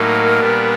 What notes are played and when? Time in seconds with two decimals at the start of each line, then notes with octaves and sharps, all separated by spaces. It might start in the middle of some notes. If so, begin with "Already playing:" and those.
Already playing: A2 F#3 A#3 D#4 A#4
0.40 A#2 G3 B3 D4